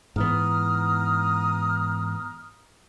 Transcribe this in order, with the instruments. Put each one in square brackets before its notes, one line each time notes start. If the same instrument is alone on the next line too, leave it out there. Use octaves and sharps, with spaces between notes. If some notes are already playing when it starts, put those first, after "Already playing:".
[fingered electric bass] G#2 E3 B3 [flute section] A#5 D#6 F6